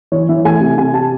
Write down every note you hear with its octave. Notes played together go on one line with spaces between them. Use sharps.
E3 C#5
E3 E5
A3 G#5
C3
C3 G#5
C3 A5